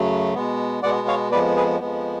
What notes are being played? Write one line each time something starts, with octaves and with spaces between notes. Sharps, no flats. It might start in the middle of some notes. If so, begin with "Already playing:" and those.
Already playing: F#2 C#3 F#3 A3
B2 G#3 B3
B2 G#3 B3 D5 F#5
C#5 F5
F2 F3 G#3 B3 B4 D5
G#4 B4
F2 F3 G#3 B3